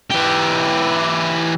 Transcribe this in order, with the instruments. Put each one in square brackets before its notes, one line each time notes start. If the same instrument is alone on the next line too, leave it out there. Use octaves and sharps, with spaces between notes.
[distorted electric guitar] E3 G4